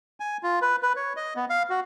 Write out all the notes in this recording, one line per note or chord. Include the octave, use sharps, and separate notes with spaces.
G#5
F4
B4
B4
C#5
D#5
B3
F5
F#4